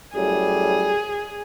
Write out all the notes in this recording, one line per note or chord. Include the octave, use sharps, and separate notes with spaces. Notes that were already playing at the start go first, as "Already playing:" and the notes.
F#2 A2 G3 G#4